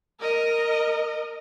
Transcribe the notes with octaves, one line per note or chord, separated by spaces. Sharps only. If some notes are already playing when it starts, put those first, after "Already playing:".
A#4 D#5